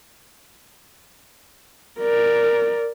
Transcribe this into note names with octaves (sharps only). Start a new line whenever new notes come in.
A#4 D5